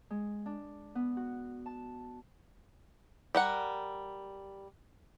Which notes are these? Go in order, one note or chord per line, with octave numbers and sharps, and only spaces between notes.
G#3
D4
B3
F#4
A5
G3 A#4 F#5